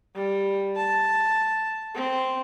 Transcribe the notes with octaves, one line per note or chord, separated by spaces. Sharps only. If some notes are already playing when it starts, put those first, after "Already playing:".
G3
A5
C4